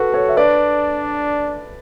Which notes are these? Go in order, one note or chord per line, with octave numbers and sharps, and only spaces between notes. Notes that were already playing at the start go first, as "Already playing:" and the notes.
Already playing: F#4 A4 B4
A4 C#5
E5
D4 B4 D5